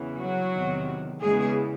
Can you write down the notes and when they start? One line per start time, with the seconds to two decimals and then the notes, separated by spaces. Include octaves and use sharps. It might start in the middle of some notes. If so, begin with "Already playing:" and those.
Already playing: E2 C#3 E3
0.17 F#3 F#4
0.52 E2 C3 D#3
1.20 E2 C#3 E3 G#3 G#4